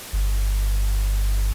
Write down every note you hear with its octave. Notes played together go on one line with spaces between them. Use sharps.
G1